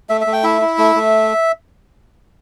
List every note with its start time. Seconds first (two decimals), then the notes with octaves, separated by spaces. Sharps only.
0.09 A3 E5
0.21 E5
0.27 A3
0.33 G5
0.43 E4 E5
0.61 E4
0.78 A3
0.96 A3